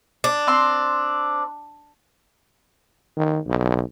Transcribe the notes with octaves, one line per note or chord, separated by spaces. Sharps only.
D4
C4 C6
D#3
B1